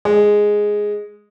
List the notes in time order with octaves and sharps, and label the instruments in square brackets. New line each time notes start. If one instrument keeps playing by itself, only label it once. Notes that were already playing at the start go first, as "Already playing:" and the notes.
[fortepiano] G#3